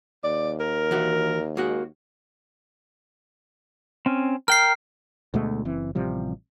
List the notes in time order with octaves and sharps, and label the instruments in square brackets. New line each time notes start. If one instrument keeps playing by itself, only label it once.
[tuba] D#2 [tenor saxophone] D5
[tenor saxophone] A#4
[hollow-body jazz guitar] E3 F#4 E5
[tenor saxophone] G#3 [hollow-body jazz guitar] A#3 F#4
[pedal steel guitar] C4 C#4
[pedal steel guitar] A#4 G5 [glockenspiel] F6 C7
[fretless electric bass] D2 B2 G#3 A3
F#1 E3 C4
A1 C3 F3 G3